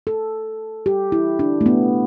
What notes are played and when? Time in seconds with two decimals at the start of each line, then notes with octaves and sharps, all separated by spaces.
0.07 A4
0.86 G4
1.12 E4
1.39 D4
1.61 A3
1.66 B3